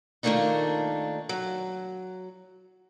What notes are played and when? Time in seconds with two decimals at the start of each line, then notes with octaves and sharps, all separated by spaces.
0.23 D#3 F3 A3 A#3 D4 D#4
1.29 F#3